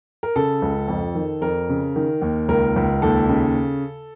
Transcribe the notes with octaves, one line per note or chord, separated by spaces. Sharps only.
A#4
C#3 A4
C#2
F2
D#3
F2 A#4
C#3
D#3
D#2
C#2 A#4
C#2
D#2 A4
C#3